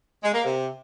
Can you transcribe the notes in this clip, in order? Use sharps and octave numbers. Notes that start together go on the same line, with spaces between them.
G#3
A#3
C3